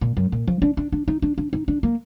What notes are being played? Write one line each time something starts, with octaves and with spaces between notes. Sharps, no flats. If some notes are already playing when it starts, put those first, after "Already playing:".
A#2
F#2
A#2
F3
D4
D4
D4
D#4
D4
D4
D#4
D4
A#3